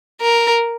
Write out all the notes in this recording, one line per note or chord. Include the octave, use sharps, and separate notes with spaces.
A#4